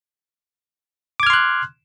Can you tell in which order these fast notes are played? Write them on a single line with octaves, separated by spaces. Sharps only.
D6 G#6 F6 C6 F#6